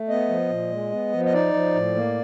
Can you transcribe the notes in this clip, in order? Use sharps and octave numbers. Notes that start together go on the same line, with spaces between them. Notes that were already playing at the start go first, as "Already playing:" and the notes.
Already playing: A3
B3 D#5
F3
A#2
G#3
B3
F3
D#5
D#4 D5
F3
A2
A#3